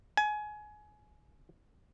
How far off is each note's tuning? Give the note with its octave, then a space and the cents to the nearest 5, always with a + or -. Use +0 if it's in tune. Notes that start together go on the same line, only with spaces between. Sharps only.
G#5 +25